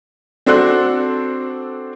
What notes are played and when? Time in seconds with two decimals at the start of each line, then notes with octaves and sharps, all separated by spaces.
0.46 C4 D4 F#4 A4 C6 F#6